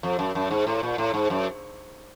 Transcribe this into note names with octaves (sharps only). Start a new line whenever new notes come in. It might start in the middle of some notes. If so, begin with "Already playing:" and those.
F2
F#2
F#2
G#2
A2
A#2
A2
G#2
F#2